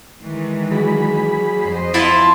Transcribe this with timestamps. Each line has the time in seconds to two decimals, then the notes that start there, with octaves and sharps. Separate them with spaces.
0.22 D#3 E3 G#3
0.71 F#3 G#4 B5
1.61 F2 C5 D#5
1.94 E4 F4 A5